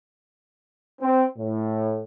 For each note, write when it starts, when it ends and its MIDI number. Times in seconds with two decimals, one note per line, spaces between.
1.01 1.25 60
1.38 2.02 45